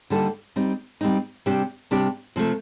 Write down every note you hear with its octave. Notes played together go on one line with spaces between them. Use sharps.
D3 G3 A#3 D#4 A4
G3 C4 D#4
G3 C4 D#4
C3 G3 D4 G4
C3 G3 D4 G4
C3 F3 A3